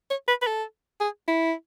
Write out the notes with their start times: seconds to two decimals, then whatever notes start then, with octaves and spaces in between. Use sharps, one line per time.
0.10 C#5
0.28 B4
0.42 B4
0.47 A4
1.00 G#4
1.28 E4